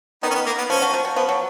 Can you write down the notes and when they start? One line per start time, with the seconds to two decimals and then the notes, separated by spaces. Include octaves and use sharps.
0.23 D#3 B3 D#4
0.31 C#4
0.34 B3
0.46 A#3
0.58 B3
0.70 F3 C#4
0.82 F#3
0.94 F3
1.05 F#3
1.16 F3 B3
1.29 F#3